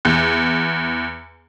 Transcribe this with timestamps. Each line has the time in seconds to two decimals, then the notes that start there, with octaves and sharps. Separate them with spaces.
0.05 E2